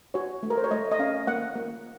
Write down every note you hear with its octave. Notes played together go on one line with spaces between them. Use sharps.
F#4 C#5
A3
A#4
C5
C#5
A3 D#5
D#5
C#4 F5
A#3 F#5
A#3